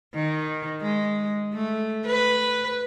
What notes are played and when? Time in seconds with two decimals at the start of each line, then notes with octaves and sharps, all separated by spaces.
0.15 D#3
0.81 G#3
1.54 A3
2.05 B4